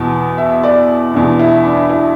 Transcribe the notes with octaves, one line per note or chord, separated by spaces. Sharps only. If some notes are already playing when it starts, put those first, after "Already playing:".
Already playing: E2 B2
E5
D5
E2 B2 D4
E4
D4
E4